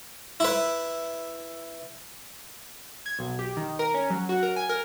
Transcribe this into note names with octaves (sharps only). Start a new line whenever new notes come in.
E4 B4
G#6
B1
G4
D#3
A#4
C#4
F#3
F#4
A#4
G#5
A#4